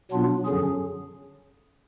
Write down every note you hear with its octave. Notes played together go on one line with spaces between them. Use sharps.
B2 F#3 B3 D4 F4
F#2 D3 F#3 C#4 G#4